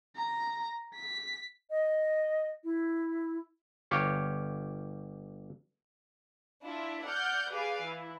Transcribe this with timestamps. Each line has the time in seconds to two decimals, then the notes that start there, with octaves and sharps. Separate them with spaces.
0.16 A#5
0.95 B6
1.70 D#5
2.64 E4
3.91 G1 G4 C#5 F5
6.64 D4 E4 F4 E5
7.05 D5 F#5 F6 G6
7.50 G4 G#4 B4 D5 F5 G#5
7.82 E3 E4